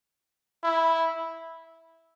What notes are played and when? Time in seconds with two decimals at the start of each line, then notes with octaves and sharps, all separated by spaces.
0.63 E4